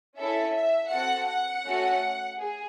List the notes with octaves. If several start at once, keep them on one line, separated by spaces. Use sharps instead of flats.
C#4 E4 A4 E5
E5
C4 F#4 A4 F#5
F#5
A3 C#4 F#4
G#4